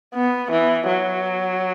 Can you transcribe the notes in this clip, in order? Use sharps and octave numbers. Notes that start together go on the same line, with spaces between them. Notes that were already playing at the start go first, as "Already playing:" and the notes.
B3
E3
F#3